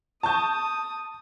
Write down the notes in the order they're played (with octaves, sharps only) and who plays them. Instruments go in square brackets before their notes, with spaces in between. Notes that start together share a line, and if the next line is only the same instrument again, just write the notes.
[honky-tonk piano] A5 C#6 G6 [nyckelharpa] D#6